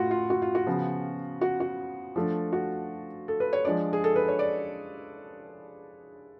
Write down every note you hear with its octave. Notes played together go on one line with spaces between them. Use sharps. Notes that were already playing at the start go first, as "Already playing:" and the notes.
Already playing: A2 A3 F4 F#4
F4
F#4
F4
F#4
C#3 F3 B3
F#4
F#4
F3 A3 D4
F#4
A4
B4
C#5
F3 G#3 D4 D5
G#4
A4
B4
C#5
D5